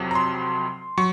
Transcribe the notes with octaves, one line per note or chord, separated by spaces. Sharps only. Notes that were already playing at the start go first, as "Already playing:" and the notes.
Already playing: F2 C3 F#3
A#5
C6
F#3 C#6